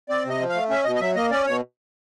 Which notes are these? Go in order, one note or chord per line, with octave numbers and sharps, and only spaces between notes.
C4 D5
C3 D#5
F3
F5
A3
C#4 E5
B2 D#5
D#5
F#3 E5
A#3 D#5
C#4 D5
B2 C#5